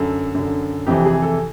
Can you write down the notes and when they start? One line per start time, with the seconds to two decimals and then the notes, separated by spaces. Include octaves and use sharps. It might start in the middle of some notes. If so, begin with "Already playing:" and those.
Already playing: F#2 D3 A4
0.34 F#2 D3
0.87 F2 C3 E3 G4
1.05 G#4
1.22 A4